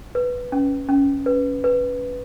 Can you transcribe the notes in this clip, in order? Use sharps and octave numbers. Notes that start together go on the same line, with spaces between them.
B4
C#4
C#4
B4
B4